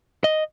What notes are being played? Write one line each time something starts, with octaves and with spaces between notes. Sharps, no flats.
D#5